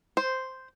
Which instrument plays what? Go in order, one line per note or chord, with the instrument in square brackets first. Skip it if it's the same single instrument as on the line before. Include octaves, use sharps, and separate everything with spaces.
[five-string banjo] C5